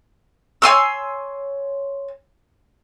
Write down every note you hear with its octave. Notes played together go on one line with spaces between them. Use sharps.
C#5 G#5 C6 E6